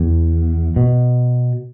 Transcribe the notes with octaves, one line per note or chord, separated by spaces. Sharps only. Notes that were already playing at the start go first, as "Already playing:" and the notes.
Already playing: E2
B2